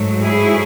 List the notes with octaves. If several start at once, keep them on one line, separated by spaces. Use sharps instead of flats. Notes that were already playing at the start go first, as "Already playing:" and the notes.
Already playing: G#2 F#3 A3
E4 G#4